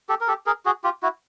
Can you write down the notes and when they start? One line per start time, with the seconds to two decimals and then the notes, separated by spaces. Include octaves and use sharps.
0.09 G4 A4
0.21 A#4
0.28 G4 A4
0.46 G#4 A#4
0.65 F#4 G#4
0.84 F4 G4
1.03 E4 F#4